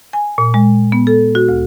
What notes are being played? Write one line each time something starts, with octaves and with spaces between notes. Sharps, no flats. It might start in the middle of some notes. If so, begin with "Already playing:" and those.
G#5
A#2
G#3
B3
A4
F#4
D2